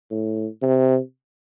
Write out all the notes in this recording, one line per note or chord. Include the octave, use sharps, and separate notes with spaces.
A2
C3